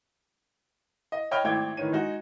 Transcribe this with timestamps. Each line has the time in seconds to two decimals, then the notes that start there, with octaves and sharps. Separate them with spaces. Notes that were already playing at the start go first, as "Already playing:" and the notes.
1.12 D#5
1.31 C#5 D#5 G5 B5 F6
1.44 G#1 A3 E4 D5 G5 G#6
1.77 A2 D#3 E3 C#5 D#7
1.92 G#3 D#4 F#4